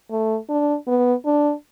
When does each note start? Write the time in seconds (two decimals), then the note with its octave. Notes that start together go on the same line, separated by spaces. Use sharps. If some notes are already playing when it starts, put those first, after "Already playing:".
0.11 A3
0.49 D4
0.87 B3
1.25 D4